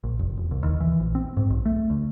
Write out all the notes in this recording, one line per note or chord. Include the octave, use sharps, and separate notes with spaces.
A#1
F1
E1
C2
D#2
E3
A#1
C4
G#2
B1
A3
D2